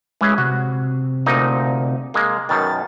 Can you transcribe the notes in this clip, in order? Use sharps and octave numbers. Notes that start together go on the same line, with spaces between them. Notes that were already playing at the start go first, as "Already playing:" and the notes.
E3 G#3 C#4 G#4
C3 F#4
D2 A#2 D#4
G#3 A#3
F#2 B2 D#3 A6